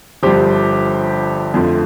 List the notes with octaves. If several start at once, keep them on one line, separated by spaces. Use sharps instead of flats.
G1 G2 F3 G4 C5
F2 D3 F3 A3